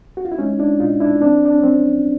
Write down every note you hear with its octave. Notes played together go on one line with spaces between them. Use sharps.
F#4
F4
E4
G#3 C#4 D#4
D4 E4
A#2 D#4 F4
D4 E4
F2 C4 D4
D4
C#4
F#3 C4